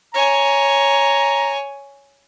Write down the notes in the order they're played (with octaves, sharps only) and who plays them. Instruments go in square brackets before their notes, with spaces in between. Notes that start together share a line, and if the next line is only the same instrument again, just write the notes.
[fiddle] C#5 G#5 [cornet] A#5